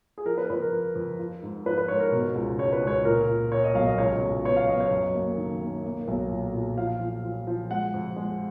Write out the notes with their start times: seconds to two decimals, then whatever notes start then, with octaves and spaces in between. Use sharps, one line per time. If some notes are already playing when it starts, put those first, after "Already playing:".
0.18 G#4
0.26 F3 A#4
0.38 B4
0.50 F2 B4
0.62 A#4
0.73 F2
0.95 F2
1.19 F3
1.42 G#2
1.66 F3 B4
1.78 B4
1.88 G#2 C#5
2.00 A#4
2.12 B2
2.35 C#2
2.59 C#2 C#5
2.73 B4
2.82 C#2
2.87 C#5
3.05 A#2 A#4
3.28 A#2
3.52 A#2 C#5
3.64 D#5
3.75 B1 F5
3.86 D#5
3.98 C#2 C#5
4.22 C#2
4.45 B3 C#5
4.56 F5
4.67 B3 D#5
4.80 C#5
4.91 F#2
5.14 A#3
5.37 D#3
5.61 A#3
5.84 A#3
6.08 B1
6.30 A#2
6.54 A#2
6.78 F3 F5
7.01 F3
7.24 F3
7.47 F3
7.70 G#3 F#5
7.94 F2
8.16 G#3